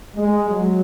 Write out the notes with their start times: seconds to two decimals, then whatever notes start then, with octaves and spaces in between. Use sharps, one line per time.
0.16 G#3
0.50 F#3